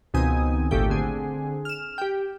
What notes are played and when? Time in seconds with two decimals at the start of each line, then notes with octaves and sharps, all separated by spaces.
0.14 C#2 B2 D#3 C4 G#5 D#6
0.71 G#1 A#2 A3 G4 G6
0.89 D3 C4 G#4
1.65 F6 E7
1.98 G4 G5